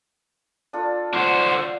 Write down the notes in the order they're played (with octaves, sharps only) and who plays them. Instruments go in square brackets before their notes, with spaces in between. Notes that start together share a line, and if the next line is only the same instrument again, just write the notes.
[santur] D4 F4 A4
[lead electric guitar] D3 C5 [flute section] F#5